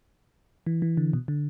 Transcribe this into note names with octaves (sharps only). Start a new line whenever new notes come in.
E3
E3
D3
B2
D3